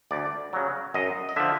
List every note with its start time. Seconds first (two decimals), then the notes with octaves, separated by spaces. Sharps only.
0.11 D2 D5
0.53 C#3 F#3
0.94 F#2 D#5
1.29 D#5
1.36 D3 F3 E5